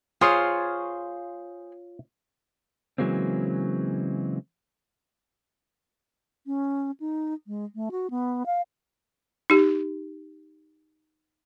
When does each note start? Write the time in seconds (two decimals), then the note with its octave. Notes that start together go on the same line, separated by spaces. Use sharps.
0.21 F4 G#4 C5 C#5 F5
2.98 C#3 E3 F#3 G#3 A#3 C4
6.46 C#4
7.00 D#4
7.47 G#3
7.75 A3
7.91 F#4
8.10 B3
8.46 F5
9.50 D#4 G4